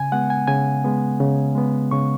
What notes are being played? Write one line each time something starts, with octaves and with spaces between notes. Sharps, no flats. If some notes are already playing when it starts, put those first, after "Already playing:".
Already playing: C#3 G#5
G#3 B3 F#5
G#5
C#3 G#5
G#3 B3
C#3
G#3 B3
C#3 C#6